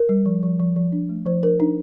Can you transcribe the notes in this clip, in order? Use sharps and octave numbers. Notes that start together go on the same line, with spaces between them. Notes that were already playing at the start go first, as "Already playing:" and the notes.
Already playing: A#4
G3
F3
F3
F3
F3
D4
A3
F3 C5
D4 A#4
D4 D#4